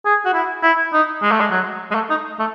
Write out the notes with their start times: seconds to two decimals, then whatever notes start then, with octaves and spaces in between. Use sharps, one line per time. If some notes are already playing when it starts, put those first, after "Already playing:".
0.05 G#4
0.25 F#4
0.34 E4
0.63 E4
0.93 D#4
1.22 G#3
1.31 A3
1.41 G#3
1.51 F#3
1.91 G#3
1.95 A3
2.10 D#4
2.39 A3